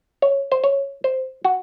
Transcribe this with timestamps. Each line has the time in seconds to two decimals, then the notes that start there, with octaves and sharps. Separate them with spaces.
0.22 C#5
0.52 C5
0.64 C#5
1.04 C5
1.45 F#4